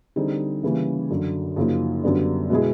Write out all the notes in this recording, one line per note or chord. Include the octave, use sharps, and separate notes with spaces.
D3 G3 C4 D#4 G#4
C#3 E3 G3 A#3 C#4
F#2 D3 F#3
F#2 C#3 F3 A#3 D#4
F#2 D3 G3 B3 D4
B2 G#3 B3 E4 G#4